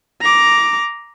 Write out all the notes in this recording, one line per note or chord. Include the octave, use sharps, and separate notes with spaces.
A#5 D6